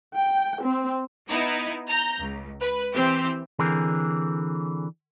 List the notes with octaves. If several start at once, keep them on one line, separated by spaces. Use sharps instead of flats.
G5
C4
B3 D#4 E4
A#5 G6
C#2
B4
E3 C4 G4
D3 E3 C4 G#4 A#4